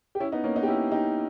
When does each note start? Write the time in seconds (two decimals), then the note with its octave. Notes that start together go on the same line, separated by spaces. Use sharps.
0.15 G4
0.20 C#4 E4
0.32 B3 D#4
0.44 A#3 C#4
0.56 B3 D#4
0.63 G4
0.68 C#4 E4
0.91 D#4 G4